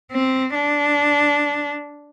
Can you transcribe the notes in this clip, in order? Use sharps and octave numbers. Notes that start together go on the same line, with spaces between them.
C4
D4